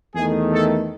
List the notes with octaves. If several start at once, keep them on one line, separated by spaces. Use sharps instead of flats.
E2 D#3 A3 G#4
A4